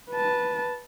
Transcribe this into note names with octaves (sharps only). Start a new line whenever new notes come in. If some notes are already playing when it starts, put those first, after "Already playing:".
B4 A5